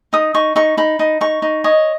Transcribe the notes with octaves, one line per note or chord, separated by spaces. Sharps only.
D#4 D#6
D#4 C#6
D#4 C#6
D#4 B5
D#4
D#4 C#6
D#4
C#5 D#5